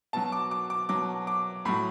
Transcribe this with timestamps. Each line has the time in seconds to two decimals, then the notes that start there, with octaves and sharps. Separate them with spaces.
0.13 B2 F#3 A5
0.32 D6
0.51 D6
0.70 D6
0.89 B2 F#3 D6
1.27 D6
1.65 A2 F#3 B5